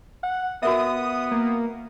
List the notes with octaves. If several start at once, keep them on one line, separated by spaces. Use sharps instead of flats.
F#5
B3 F#4 A#4 E5 D#6
A#3